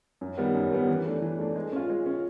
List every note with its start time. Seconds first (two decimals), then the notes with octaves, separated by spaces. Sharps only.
0.21 F#2
0.38 D#3 G3 B3
0.54 F#2
0.71 D#3 G3 B3
0.88 E3
1.05 A3 D4
1.22 E3
1.39 A3 D4
1.56 G#3
1.72 C#4 F4
1.90 G#3
2.06 C#4 F4